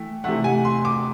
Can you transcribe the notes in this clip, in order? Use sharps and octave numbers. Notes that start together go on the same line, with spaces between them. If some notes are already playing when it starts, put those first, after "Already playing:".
Already playing: E3 A3 G5
C3 E3 A3 F#5
G#5
C6
D6